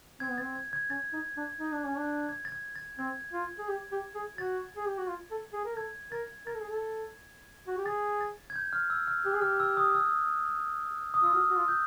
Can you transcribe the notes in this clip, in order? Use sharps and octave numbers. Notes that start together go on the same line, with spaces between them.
C4 G#6
B3
A6
C4
G#6
G#6
C#4 A6
D#4
D4
D#4
D4
C#4
D4
G#6
A6
G#6
A6
C4 G#6
F4
G#4
G4
G4
G#4
F#4 A6
G#4
G4
F#4
F4
A4
G#4
A#4
A4 G#6
A#4 A6
A#4 A6
A4
G#4
A4
F#4
G4
G#4 A6
A6
G#6
G6
F6
E6
F6
G4 F#6
G#4
G4 F6
E6
D#6
E6
D#6
F4 E6
F#4 F6
F#4
F4
G6